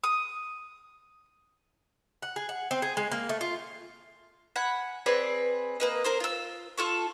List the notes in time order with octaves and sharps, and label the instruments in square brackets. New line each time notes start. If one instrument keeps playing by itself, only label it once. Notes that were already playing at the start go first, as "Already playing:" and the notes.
[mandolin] D#6
[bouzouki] F#5
G#4
F#5
C4
G#4
G#3
A#3
A3
F4
[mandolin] F#5 G#5 B5
C4 G#4 B4 D5
A#3 B4 D#5
A#4 C5 C6
F4 E6
F4 A4 C#6